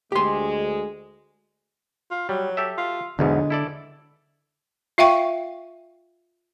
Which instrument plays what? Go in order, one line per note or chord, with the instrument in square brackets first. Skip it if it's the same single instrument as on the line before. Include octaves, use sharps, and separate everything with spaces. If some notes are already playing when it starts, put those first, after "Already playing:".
[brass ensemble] D2 G#3 [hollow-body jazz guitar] G4 C6
[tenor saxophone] F4
[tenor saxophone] F#3 [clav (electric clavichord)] G3
[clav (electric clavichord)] G4 A4 E5
[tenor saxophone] F4
[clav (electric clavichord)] B1 E2 G#2 [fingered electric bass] D3 [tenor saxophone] G#3
[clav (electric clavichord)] E4 A4 D5
[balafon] F4 E5 F5 G5 C#6